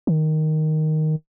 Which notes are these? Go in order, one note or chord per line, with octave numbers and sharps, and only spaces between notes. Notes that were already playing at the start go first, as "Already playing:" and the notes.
D#3